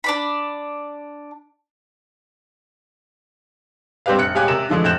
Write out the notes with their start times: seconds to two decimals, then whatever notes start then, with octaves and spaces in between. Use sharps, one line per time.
0.04 D4 D5 B5
4.06 G3 C4 D4 G4 B4 F5
4.18 F1 F#6 C#7
4.35 D#1 G#3 G4 F5 G#5 F#6
4.48 C3 A#4 E7
4.69 D3 E3 F3 G#3 A3
4.84 F1 F#6 G6 E7